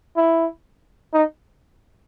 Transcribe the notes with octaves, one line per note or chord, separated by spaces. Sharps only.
E4
D#4